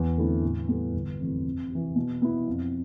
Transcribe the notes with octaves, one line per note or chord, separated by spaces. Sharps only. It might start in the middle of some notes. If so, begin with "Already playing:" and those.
Already playing: E2
D3 A3 C4 E4
A2
G3 B3 E4 A4
G1
F2 C3 E3 A3
F2
C3 E3
B2
B3 E4
F2